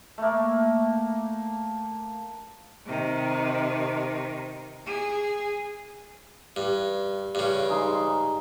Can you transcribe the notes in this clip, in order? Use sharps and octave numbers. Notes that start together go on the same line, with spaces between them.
A3 A#3
C3 D#3
G#4
G2
G2 C#3
G#3 D#4 C6